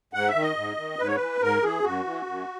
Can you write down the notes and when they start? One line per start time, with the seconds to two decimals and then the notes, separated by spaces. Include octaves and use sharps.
0.13 G#2 F#5
0.28 E5
0.35 D#3
0.42 D#5
0.56 G#2
0.78 D#3
0.99 G#2 B4
1.07 C#5
1.15 E3 B4
1.41 G#2 A#4
1.62 E3 G#4
1.84 F#2 F#4
2.04 E3
2.27 F#2